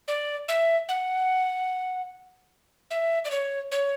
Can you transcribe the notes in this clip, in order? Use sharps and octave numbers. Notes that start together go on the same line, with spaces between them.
D5
E5
F#5
E5
D5
C#5
C#5